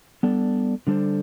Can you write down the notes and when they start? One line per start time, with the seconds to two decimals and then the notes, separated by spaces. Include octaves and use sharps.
0.23 G3 B3 D4 A4
0.87 D3 G3 D4 A4 C5